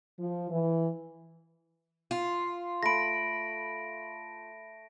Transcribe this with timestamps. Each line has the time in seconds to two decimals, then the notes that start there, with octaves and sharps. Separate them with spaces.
0.20 F3
0.50 E3
2.11 F4
2.83 A3 B5 A#6 D7